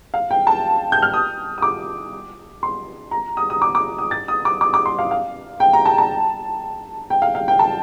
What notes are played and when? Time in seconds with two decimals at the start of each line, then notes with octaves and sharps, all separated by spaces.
0.14 F5
0.31 G5
0.47 A5
0.92 G6
1.02 F6
1.14 D#6
1.58 D#6
1.62 D6
2.63 C6
3.11 A#5
3.37 D#6
3.50 D#6
3.62 D6
3.75 D6
3.98 D#6
4.11 A6
4.28 D#6
4.45 D6
4.61 D6
4.74 D6
4.86 C6
4.99 F5
5.11 F5
5.60 G5
5.73 A#5
5.86 A5
5.98 A5
7.10 G5
7.22 F5
7.35 F5
7.48 G5
7.59 A5